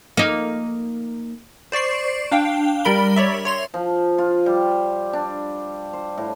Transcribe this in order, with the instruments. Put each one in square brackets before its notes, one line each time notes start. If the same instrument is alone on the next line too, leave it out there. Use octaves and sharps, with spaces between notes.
[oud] A#3 D#4
[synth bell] C5 D5 C#6 C7
D4 F5 G5
G3 A#4 B5 G7
C#5 D5 E5
C#5 C6 F7
[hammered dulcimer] F3
F4
G3
D4
C5
A2